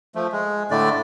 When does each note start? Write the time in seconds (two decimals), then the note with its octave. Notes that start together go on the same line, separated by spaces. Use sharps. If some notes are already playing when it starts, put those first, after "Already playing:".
0.15 F3 A3
0.33 G#3
0.71 A2 D3 A3 D5